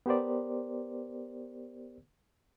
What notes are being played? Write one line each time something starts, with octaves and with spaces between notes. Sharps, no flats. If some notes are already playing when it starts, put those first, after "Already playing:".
B3 G4 A#4 C5 D5